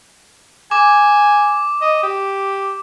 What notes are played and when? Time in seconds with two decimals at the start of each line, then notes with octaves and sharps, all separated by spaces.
0.71 G#5 D6
1.82 D#5
2.03 G4